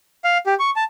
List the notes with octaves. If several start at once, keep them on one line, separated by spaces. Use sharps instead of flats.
F5
G4
C#6
A5